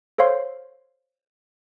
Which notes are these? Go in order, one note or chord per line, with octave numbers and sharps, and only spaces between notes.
A4 C5 C#5 F5 C6